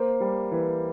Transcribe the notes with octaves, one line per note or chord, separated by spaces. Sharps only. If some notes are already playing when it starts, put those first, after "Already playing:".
Already playing: A#3 C5
G3
E3